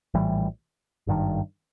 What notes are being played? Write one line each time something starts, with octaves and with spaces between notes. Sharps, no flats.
A#1 A2 E3 G3
G#1 G2 D#3